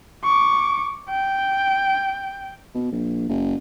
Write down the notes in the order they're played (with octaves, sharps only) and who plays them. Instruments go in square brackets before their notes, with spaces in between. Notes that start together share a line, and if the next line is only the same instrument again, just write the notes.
[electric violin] C#6 D6
G5
[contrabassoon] B2
A#1
F#1